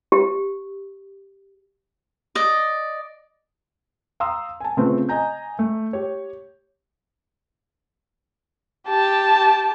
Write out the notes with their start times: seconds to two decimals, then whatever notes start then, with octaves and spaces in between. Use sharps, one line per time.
0.12 G4
2.35 D5 D#5
4.20 F5 A#5 C6 D#6 E6
4.60 G#5 A5
4.77 C#3 A3 B3 C4 F4
5.09 D#5 G#5 A#5 G6
5.59 A3
5.93 G4 C#5
8.88 G4 A5